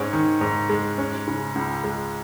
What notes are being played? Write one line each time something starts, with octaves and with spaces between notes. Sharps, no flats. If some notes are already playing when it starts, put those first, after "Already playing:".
Already playing: G#2 C#4
D#3
G#2
G#3
C#4
C#3
C#2
G#3